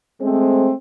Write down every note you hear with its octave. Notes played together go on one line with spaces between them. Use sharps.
G#3 A3 C4